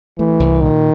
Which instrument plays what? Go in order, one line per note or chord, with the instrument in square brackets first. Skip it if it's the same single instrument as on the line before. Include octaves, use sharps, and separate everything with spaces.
[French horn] E3 [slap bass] A3
[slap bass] C2
[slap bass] A#2 [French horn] D#3